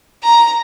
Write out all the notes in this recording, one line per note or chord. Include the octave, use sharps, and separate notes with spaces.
A#5